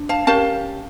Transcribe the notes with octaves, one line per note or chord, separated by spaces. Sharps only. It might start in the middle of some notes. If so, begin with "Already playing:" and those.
Already playing: D4
F5 A5
C#4 G4 A#4 F5 A5